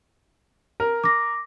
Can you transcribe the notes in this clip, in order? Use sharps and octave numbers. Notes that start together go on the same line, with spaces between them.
A#4
D6 A#6